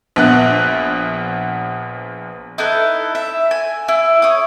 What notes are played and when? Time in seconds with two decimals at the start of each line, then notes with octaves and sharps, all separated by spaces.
0.16 A#1 B3 F#6
2.58 D#4 E4 A4 B4
3.15 E5
3.51 G#5
3.88 E4
4.22 C#5 D#6